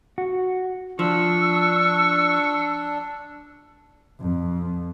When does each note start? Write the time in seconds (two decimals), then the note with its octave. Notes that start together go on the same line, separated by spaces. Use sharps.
0.18 F#4
0.99 F3 D4 C#6 E6
4.20 F2